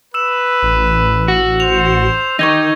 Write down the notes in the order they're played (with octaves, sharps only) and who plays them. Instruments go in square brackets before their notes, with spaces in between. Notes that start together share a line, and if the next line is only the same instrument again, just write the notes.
[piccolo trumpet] B4 [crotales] E6 E7
[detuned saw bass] A1
[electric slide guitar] F#4
[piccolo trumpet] C5 [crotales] F7
[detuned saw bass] D#3 [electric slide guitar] D#4 [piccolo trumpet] G4 [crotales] C#6 G#6 A#6